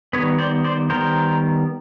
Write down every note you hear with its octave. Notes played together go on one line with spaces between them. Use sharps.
D#3 G3 B3 B4 C#5
C5 D5
C5 D5
D#3 G3 B3 A#4 C5